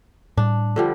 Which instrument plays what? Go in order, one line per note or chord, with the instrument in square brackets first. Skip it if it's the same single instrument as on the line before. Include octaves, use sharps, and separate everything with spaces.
[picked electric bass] A2 G3 [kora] D4
[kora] D3 F3 G3